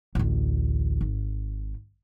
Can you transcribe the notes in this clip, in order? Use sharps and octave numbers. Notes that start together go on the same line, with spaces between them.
A1 D2
G#1